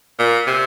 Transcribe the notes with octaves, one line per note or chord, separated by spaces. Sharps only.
A#2
C3